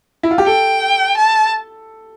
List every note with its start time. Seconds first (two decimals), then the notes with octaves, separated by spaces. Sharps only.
0.23 E4
0.31 F4
0.38 G4
0.46 A4 G5
1.17 A5